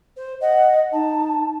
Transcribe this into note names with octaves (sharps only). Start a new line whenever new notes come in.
C5
D#5 F#5
D#4 A5